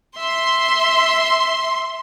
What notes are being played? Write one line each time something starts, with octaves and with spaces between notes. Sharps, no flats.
E5 C6